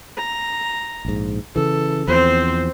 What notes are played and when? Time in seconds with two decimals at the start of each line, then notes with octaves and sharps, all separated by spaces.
0.18 A#5
1.05 A#1 G#2
1.56 C#3 E3 A4
2.07 E2 F3 C4 C5